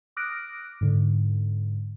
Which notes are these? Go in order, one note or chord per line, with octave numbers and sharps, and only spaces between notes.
D6 D#6 F6 F#6 A#6 D7
G#2 D3